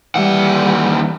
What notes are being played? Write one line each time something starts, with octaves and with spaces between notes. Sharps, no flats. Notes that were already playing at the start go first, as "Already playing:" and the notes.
D#2 E3 G3 F#5